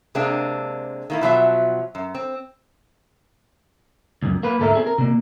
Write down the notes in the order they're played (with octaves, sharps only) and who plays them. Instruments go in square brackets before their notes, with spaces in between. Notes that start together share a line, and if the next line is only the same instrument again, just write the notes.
[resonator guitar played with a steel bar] C3 G#3 A#3 C4 D4
D#3 A#3 E4
B2 F3 F#3 E5
F#2
C4
[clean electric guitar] C#2 F#2
A#3 B4
D2 G#2 A4 A#4 E5
C4 G#4 A4
A#4
C3 A#3